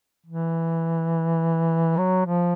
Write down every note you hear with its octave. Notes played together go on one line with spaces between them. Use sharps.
E3
F#3
F3